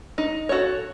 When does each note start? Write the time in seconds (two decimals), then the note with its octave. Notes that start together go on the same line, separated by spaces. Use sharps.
0.18 D#4
0.49 F#4 A4 C#5